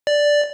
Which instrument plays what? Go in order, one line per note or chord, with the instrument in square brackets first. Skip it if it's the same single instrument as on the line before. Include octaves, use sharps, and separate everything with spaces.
[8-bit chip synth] D5